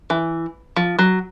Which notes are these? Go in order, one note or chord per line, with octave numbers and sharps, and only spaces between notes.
E3
F3
F#3